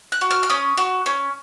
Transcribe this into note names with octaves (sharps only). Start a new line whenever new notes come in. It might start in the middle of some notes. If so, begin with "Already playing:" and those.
F#6
F#4
F6
F6
C#4 D#6
F#4
C#4